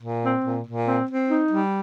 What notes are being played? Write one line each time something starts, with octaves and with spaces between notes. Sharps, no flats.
A#2
C4
A#2
A#2
C4
C4
D#4
G3